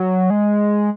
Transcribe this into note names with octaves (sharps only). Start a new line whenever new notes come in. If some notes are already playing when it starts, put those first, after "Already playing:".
Already playing: F#3
G#3